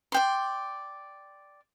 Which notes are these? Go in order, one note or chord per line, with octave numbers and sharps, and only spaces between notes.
D5 G5 C6